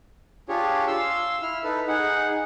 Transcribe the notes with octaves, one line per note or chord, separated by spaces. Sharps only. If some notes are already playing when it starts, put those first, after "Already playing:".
D4 F4 G4 G#4 C#5
F5 C6 E6
E4 F6
D#4 A4 B4
D#4 G#4 F#5